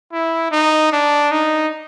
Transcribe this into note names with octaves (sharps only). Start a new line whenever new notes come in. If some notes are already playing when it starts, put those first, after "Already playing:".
E4
D#4
D4
D#4